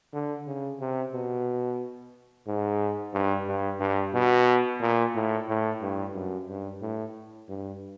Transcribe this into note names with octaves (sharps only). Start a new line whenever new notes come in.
D3
C#3
C3
B2
G#2
G2
G2
G2
B2
A#2
A2
A2
G2
F#2
G2
A2
G2